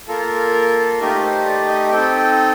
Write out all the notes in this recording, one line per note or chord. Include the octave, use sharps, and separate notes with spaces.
A#3 F4 A4 A#4
A3 D#4 G4 A#4
C5
D5
D#5
C4 D#4 A4 G5